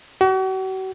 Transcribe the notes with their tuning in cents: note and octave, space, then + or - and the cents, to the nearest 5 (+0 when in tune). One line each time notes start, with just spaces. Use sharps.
F#4 +40